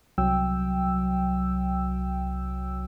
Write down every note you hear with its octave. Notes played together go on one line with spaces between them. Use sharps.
C2 F#3 G5 E6